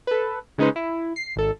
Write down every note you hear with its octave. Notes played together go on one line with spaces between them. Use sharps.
A4 B4
C#3 G#3 C#4 D#4 B4 C5
E4
C7
G#1 A4